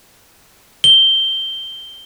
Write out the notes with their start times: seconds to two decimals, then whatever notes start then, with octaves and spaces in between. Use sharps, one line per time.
0.84 G7